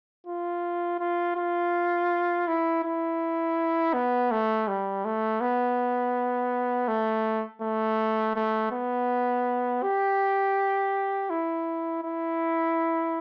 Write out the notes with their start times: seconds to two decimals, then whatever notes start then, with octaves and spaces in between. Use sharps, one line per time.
0.27 F4
1.00 F4
1.36 F4
2.48 E4
2.84 E4
3.94 B3
4.32 A3
4.68 G3
5.05 A3
5.41 B3
6.88 A3
7.62 A3
8.36 A3
8.72 B3
9.83 G4
11.30 E4
12.03 E4